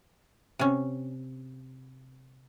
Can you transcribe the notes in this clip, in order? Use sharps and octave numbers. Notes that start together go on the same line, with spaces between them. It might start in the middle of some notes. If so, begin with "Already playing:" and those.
C3 C#4